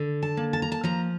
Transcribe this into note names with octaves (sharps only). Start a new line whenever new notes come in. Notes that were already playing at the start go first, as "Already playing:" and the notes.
Already playing: D3
A5
A#3
A5
A#5
A5
F3 A#5